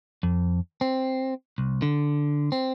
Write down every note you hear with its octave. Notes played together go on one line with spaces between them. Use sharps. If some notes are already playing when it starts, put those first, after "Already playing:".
F2
C4
C2
D3
C4